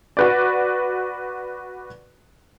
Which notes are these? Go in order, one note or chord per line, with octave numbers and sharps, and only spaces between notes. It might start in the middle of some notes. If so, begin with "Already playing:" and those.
F#4 B4 D5